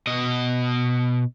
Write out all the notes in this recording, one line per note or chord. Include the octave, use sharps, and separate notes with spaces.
B2 D#5